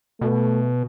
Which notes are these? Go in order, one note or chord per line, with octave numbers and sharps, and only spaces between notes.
B2 A3